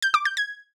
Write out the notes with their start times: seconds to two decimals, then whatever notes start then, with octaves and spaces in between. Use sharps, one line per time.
0.02 G6
0.14 D6
0.25 G6
0.37 G#6